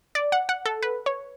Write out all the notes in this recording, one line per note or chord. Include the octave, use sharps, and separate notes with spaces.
D5
F#5
F#5
A4
B4
C#5